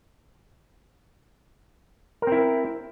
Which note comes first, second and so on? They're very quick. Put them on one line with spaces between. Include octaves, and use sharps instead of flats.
A#4 C4 E4